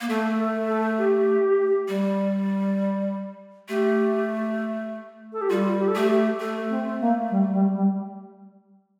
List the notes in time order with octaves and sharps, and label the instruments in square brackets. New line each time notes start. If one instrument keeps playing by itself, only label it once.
[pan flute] A#3
[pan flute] A3 [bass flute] A4
[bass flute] A4
A4
G4
[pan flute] G3
[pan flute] A3 [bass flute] G4
[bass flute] A4
G4
[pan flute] G3 [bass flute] F4
[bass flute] G4
A4
[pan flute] A3 [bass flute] G4
[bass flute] G4
[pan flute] A3 [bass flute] A4
[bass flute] C4
A#3
G3
G3
G3